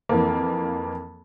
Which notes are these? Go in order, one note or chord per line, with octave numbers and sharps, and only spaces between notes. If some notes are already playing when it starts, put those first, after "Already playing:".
F2 E3 A#3